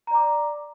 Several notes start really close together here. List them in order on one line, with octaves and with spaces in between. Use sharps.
A#5 D5 D6